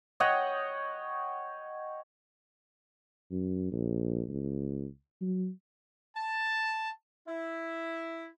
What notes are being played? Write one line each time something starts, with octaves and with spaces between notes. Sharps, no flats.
C#5 D#5 F#5 G5
F#2
A#1
C#2
F#3
A5
E4